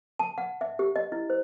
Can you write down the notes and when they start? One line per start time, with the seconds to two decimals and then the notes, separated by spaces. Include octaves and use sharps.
0.19 A5
0.38 F#5
0.61 E5
0.79 G4
0.96 D#5
1.12 E4
1.30 C5